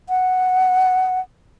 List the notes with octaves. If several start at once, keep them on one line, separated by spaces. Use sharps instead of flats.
F#5